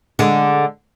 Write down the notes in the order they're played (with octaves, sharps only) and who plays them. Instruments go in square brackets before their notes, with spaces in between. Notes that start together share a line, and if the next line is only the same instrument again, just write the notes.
[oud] D3 G#3